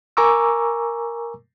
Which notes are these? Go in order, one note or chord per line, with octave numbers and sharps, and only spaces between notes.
A#4 G#5 A#5 C#6 D6 E6